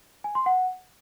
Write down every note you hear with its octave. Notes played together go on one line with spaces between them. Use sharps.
G#5
C6
F#5